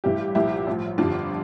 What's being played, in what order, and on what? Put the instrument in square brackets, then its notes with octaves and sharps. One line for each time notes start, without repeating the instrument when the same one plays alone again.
[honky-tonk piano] A1 G2 E3 G3 E4 G4
C2 A#2 F3 E4 G4
A1 A2 F3
G1 F2 D3 G3 D4 F4